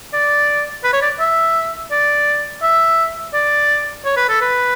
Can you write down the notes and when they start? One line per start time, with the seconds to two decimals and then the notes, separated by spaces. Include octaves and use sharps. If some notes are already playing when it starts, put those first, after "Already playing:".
0.13 D5
0.84 B4
0.93 C#5
1.02 D5
1.20 E5
1.91 D5
2.63 E5
3.34 D5
4.05 C#5
4.16 B4
4.29 A4
4.41 B4